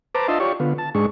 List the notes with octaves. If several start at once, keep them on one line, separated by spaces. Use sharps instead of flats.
B4 C5 A5 A#5 D6
D4 F4 D#5 E5 A5 C6
F4 G4 C#5 D5 C#6
D3 B3 F4
A5
G#2 G#3 D4 C#6